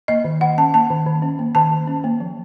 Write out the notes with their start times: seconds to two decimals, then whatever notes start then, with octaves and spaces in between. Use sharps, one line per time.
0.08 A#3 D#5
0.24 D#3
0.41 D#3 F#5
0.58 C#4 A5
0.74 A#3 A5
0.90 D#3
1.06 D#3
1.22 C#4
1.39 A#3
1.55 D#3 A5
1.72 D#3
1.88 C#4
2.04 A#3
2.20 F3